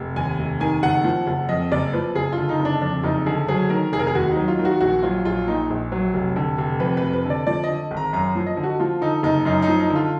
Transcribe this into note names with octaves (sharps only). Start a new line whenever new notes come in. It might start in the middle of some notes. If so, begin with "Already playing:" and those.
Already playing: F1
D#2 G#5
F1
D#3 G#5
F#1 F#5
F3
F#1
F2 D#5
F#1 D5
F3 B4
F#1 G#4
F4
D3
D#4
F#1
D4
F2 D4
F#1 D#4
D3 G#4
F#3 G#4
D#3 A#4
F1 G#4
A#4
G#4
D#2 F#4
D#4
F#3
F4
D#3
F#4
A#1 F#4
F#3 F4
A#1 F4
A#2 D#4
A#1
F#3
F1
D3
F1
F2 B4
F1 B4
B4
D3
D5
F3 D5
D#5
D3
G#1
A#5
F#2 A#5
F3
D#5
D3
F#4
F3 F4
D3 D#4
F#1 D#4
F#2 D#4
D#4
F3
D#4
D3
F4